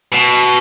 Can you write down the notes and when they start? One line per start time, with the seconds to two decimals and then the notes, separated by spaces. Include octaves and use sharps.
0.13 B2